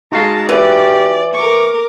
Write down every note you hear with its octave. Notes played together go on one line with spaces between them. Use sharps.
G#3 D#4 F#4 F5 A5 A#5
E3 G4 D5
A#4 C#6 D6